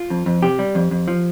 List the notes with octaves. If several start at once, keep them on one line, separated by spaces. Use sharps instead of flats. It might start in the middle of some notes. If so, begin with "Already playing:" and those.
Already playing: F4
F2
F2
C3 G4
G3
F2
F2
F3